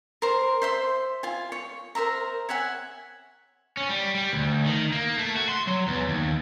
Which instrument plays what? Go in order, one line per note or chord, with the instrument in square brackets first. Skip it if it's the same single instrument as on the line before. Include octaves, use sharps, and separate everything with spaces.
[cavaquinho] A#4 C5
C5 E5 C6
F4 G#5
C#5
A#4 C5 E5 A#5
C#5 E5 F#5 G#5
[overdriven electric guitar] C#4
G3
G3
D2
D#3
A#3
A3
F#4
C6
F#3
E2
D#2